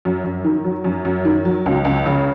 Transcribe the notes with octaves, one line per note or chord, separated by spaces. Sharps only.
F#2
F#2
D#3
F#3
F#2
F#2
D#3
F#3
C#2
C#2
C#3